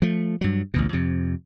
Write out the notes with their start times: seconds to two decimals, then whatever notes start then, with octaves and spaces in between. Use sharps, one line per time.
0.02 F3 A3
0.41 G2 F#3
0.74 A1 D2 B2
0.93 F2 C3